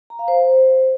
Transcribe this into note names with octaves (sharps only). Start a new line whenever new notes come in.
A#5
F5
C5